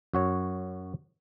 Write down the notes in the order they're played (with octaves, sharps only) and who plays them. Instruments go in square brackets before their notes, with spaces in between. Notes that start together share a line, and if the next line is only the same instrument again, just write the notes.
[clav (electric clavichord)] F#2 F#4 C#5